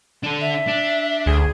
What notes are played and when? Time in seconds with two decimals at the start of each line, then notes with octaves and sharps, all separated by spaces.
0.24 D4 A4
0.41 E5
0.68 D4
1.26 D2 G#4